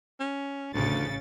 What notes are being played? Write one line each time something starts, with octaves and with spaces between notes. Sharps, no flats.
C#4
A1 D2 C#3 A6